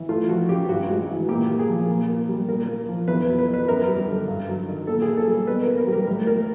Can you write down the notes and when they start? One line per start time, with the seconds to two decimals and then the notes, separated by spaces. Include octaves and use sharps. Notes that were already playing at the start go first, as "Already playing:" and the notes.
Already playing: E3
0.09 A3 F4
0.29 F3 F#4
0.49 C#3 G4
0.69 G2 F#4
0.89 G#3 F#4
1.09 E3
1.29 A#2 G4
1.49 A#3
1.59 G#4
1.68 F3
1.88 A#2
2.09 A#3
2.28 G3
2.48 A#2 A#4
2.68 A#3
2.89 F3
3.08 E2 B4
3.28 F#3
3.39 B4
3.48 B2
3.54 B4
3.68 F#2 A#4
3.88 G3
4.08 D3
4.28 G2
4.48 F#3
4.68 D#3
4.87 A#2 A4
5.02 G#4
5.08 A#3
5.17 A4
5.27 G3
5.47 B2 B4
5.63 A#3 A#4
5.78 A#4
5.87 G3
5.93 A#4
6.07 A2
6.27 A#3 A#4